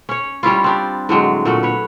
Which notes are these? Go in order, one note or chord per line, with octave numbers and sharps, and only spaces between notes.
C#4 C#5
G3 C#4 E4 F4
C4 D4 G4
A2 D3 F#3 G#3
A#2 A3 F#4
B4 C#5